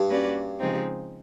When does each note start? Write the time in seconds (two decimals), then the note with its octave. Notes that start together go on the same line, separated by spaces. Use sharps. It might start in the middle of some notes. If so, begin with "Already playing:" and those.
Already playing: G2
0.08 A#3 C#4 F#4 B4 D5
0.59 C#3 F3 G#3 C4 D#4